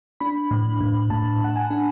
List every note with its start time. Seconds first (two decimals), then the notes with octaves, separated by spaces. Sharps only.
0.20 D4 B5
0.51 A2
0.81 A2
1.10 A2 A5
1.41 A2 F#5
1.56 G#5
1.71 D4